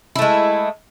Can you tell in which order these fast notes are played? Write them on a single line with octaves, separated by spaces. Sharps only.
E4 A3 G#3